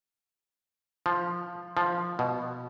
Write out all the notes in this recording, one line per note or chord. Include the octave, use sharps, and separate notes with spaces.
F3
F3
B2